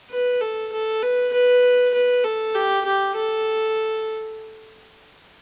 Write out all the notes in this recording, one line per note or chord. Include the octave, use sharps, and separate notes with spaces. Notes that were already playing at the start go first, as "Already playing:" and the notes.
B4
A4
A4
B4
B4
B4
A4
G4
G4
A4